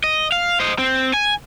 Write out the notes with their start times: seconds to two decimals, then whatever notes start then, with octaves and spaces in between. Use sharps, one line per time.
0.04 D#5
0.32 F5
0.60 C5 D#5
0.78 C4
1.14 G#5